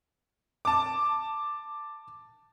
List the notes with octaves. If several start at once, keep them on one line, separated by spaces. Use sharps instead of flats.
A5 D6